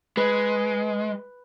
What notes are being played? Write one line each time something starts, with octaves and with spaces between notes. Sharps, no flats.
G#3 B4